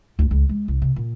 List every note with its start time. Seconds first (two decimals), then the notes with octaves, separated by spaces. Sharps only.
0.19 D2
0.31 C#2
0.49 G#3
0.68 C2
0.82 C3
0.96 A#2